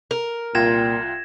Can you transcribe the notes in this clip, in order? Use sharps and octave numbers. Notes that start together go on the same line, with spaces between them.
A#4
C2 A#2 F4 G5 G#6 A#6 E7